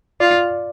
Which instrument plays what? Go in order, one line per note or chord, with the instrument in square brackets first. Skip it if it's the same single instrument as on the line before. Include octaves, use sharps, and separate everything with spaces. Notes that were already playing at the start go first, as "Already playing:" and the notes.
[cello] F4 [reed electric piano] D5